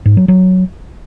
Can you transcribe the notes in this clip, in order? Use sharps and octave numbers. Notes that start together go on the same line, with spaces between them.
G#2
F#3
F#3